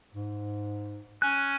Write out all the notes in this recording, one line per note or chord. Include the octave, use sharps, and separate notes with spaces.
G#2
C#4 G#5 F#6